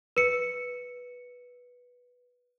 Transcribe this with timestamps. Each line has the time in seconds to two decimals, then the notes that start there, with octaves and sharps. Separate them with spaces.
0.17 B4 C#7